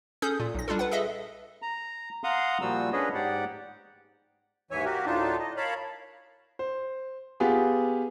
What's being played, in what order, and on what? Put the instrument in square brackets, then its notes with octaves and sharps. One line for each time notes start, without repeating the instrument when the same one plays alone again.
[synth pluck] C#4 G#4 A4 D#6 G6
A#2
B1 A#6
G3 D4 F4 A4
B4 F#5
G#4 A4 D#5 E5
[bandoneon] A#5
F5 F#5 A#5 C6 D#6
A#2 F3 G3 F#4 E6
C#4 D4 G#4 B4 C#5 D#5
G#2 G4 D5 F#5
[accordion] D#2 G#2 E3 C#5 E5 G#5
A#3 F#4 G4 A#4
D2 A2 D4 D#4 F4 A5
D#5
A#4 C#5 F5 A5 B5
[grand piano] C5
B3 F4 G4 G#4